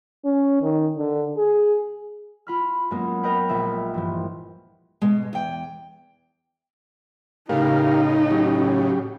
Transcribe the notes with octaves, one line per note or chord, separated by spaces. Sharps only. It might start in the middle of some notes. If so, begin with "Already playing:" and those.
C#4
D#3
D3
G#4
F4 B5 F6
F#2 G#3 A#3 B3
A#4 B4 D#5 F5 G5 B5
A#1 E5
G2 E3 F3
B2 G#3
E2 G5
A2 C#3 D#4 G4 A#4 F5
F#3 C#4 G4